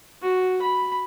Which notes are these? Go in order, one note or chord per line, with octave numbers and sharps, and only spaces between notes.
F#4
B5